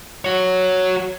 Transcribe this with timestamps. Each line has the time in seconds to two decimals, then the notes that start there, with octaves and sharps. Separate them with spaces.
0.25 F#4 C#5